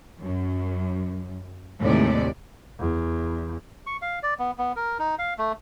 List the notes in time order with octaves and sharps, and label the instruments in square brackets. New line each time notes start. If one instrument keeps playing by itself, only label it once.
[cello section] F#2
D#2 A2 C3 G#3 A3 D5
[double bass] E2
[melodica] C#6
F5
D5
B3
B3
A#4
D#4
F5
A3